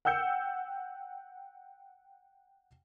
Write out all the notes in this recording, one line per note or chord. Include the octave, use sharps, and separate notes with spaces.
F#5 G5 E6 G6 C#7